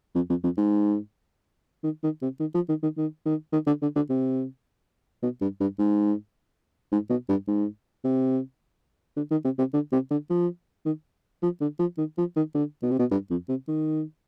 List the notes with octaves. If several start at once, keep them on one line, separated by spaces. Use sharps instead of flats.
F2
F2
F2
G#2
D#3
D#3
C3
D#3
F3
D#3
D#3
D#3
D#3
D#3
D3
D3
D3
C3
B2
G2
G2
G#2
G#2
B2
G2
G#2
C3
D3
D#3
C3
C3
D3
C3
D3
F3
D#3
F3
D3
F3
D#3
F3
D#3
D3
B2
C3
B2
G2
F2
C3
D#3